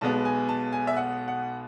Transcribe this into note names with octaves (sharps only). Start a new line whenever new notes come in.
B1 B2 G#3 B3 A5
G#5
A5
G#5
E5
F#5
F#5